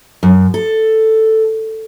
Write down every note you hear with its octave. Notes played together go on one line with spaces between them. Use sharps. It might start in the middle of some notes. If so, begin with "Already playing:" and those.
F#2
A4